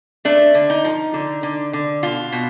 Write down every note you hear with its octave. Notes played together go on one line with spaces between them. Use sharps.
A3 D4
D3
D#4
F3
D3
D3
D3
B2 F4
B2